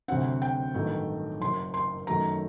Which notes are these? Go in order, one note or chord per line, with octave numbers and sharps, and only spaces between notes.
D2 C3 F#3 C4 F#5
G5
A1 G2 D#3 F#3 A3
F#1 F#2 F#3 C6
C6
F#2 D#3 F#3 A3 A#5